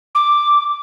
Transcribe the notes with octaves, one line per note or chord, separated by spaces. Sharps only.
D6